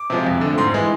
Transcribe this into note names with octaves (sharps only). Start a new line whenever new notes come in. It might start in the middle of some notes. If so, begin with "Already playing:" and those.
Already playing: D6
C3 F3 G#3
F2
D3 A3
G#2 C6
E3 G#3